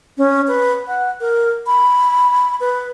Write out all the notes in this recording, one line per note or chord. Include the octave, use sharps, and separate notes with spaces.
C#4
B4
F#5
A#4
B5
B4